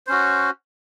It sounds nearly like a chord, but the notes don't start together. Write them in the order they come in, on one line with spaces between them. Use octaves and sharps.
C5 C#4 F#4